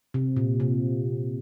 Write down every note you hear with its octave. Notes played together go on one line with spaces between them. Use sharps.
C3
A#2
C3